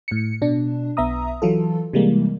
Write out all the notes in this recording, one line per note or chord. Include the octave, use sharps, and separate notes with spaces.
A2 C#7
B2 D4
B1 B3 E5 A#5 D#6
E3 F#3 F4 A4
C3 E3 G3 G#3 A#3